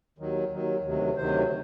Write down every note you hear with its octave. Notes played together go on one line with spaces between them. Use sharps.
D#2 D#3 F#3
D#2 D#3 F#3
D2 C3 D#3 F#3
D2 C3 D#3 F#3 C5